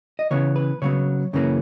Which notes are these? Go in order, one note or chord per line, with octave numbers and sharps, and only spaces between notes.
D#5
C#3 E3 B3 C#5
B4
C#3 F#3 B3 C#5
F#2 C#3 E3 A#3 C#4